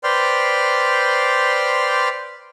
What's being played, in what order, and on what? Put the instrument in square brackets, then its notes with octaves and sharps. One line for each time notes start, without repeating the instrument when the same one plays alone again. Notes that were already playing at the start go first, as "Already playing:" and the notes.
[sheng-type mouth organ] B4 C5 D5 G5 C6 F6